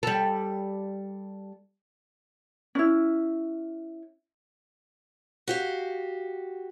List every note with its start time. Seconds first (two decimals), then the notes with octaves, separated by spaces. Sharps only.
0.03 G3 A4
2.75 C#4 E4
5.48 F#4 G4 F5